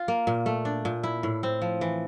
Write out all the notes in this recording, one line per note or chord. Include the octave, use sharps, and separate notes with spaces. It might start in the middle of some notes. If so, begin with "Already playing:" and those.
Already playing: F4
A#3
A#2
A3
D4
A#2
E4
A2
C4
F3
E3